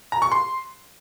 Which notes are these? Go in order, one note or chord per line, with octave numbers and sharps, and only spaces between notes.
A#5
C#6
C6